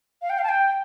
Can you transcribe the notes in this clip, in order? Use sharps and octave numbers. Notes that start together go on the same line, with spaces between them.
F5
G5
F5
A5
G5